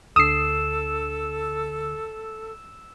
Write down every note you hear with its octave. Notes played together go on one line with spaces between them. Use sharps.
D2 D3 A4 D#6 E6 C7 E7